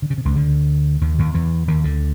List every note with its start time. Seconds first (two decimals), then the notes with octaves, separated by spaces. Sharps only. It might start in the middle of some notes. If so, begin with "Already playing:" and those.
0.02 D3
0.10 C#3
0.18 C3
0.25 C#2 C#3
0.36 D2 D3
1.01 D#2 D#3
1.18 D#2 D#3
1.34 E2 E3
1.68 D#2 D#3
1.84 D2 D3